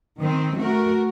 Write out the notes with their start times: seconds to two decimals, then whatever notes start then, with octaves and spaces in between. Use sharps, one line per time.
0.20 D#3 C4
0.58 A3 F#4 A#4